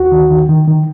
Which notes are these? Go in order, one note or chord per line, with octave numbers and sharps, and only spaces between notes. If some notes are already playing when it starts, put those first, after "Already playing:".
Already playing: D#2 F#4
D#3
D#3
D#3
D#3